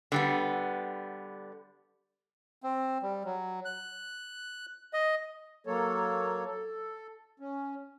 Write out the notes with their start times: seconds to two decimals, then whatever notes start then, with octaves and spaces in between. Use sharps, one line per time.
0.12 D3 G3 B3
2.63 C4
3.02 G3
3.25 F#3
3.65 F#6
4.93 D#5
5.67 F#3 A#3 A4 C#5
6.46 A4
7.40 C#4